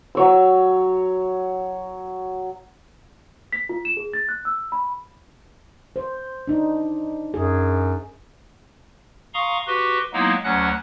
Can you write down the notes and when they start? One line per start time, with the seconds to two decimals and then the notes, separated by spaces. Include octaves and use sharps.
0.15 F#3 C#5 E6
3.52 B6
3.69 F4
3.85 E7
3.97 G#4
4.13 A6
4.29 F#6
4.45 E6
4.72 B5
5.96 C5
6.47 D4 D#4
7.34 F#2 G#4
9.34 F5 A#5 C6 C#6 D#6
9.67 F#4 G4 B4 C6
10.13 F#3 G#3 A#3 B3 D#4 E4
10.44 D2 F#3 C#4 F#5 F#6